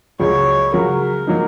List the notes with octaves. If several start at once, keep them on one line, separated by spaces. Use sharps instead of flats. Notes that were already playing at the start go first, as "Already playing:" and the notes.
C#2 C#3 F#3 C#5
C#3 F#3 C#4 F#4 A#4
F#3 A#3 D#4